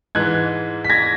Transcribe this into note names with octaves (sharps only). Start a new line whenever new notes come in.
G#2 E3 G#3 F#6 G#6
B6
G#6 A#6